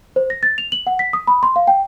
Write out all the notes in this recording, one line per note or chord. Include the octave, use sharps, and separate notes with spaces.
C5
A#6
A6
F7
F#7
F#5
B6
D#6
B5
C6
F5
G5